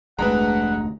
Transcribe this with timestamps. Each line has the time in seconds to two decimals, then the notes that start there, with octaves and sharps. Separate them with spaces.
0.19 F1 D2 G#3 D4 B4 F#5 A#5